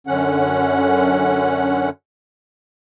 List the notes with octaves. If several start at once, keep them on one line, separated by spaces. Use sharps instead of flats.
F#2 D3 C#4 F#5